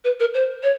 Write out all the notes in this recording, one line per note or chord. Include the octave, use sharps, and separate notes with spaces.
B4
A#4
C5
C#5